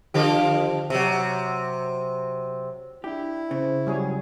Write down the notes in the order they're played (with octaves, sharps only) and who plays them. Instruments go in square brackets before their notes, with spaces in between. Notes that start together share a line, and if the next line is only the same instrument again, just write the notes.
[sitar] D3 F3 G4
C3 F#3
[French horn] D4 [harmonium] E4 [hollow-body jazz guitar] G4
[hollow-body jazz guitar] C#3 [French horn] C5
[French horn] F#3 [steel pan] G3 G#4 C#5